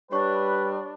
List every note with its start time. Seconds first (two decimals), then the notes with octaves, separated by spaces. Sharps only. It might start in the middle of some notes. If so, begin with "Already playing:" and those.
0.12 G3 D4 G4 B4 C#5 C#6